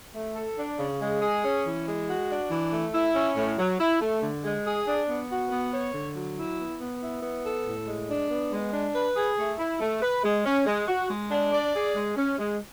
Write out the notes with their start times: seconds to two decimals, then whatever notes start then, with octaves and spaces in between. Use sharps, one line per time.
0.14 A3
0.35 A4
0.57 D4
0.79 C#3
1.00 G#3
1.21 G#4
1.43 C#4
1.64 E3
1.86 G#3
2.08 F#4
2.29 D4
2.50 E3
2.72 A3
2.93 E4
3.15 C#4
3.36 A2
3.58 F#3
3.79 E4
4.00 A3
4.22 D3
4.44 G#3
4.66 G#4
4.87 D4
5.08 B3
5.30 F#4
5.51 B3
5.72 C#5
5.94 D3
6.16 F#3
6.37 E4
6.59 B3
6.80 B3
7.01 E4
7.23 B3
7.45 A4
7.66 A2
7.87 G#3
8.08 D4
8.30 B3
8.51 G#3
8.73 D4
8.94 B4
9.16 G#4
9.38 A3
9.58 E4
9.80 A3
10.02 B4
10.23 G#3
10.45 C#4
10.66 G#3
10.88 F#4
11.09 G#3
11.31 D4
11.52 D5
11.74 G#4
11.95 G#3
12.16 C#4
12.38 G#3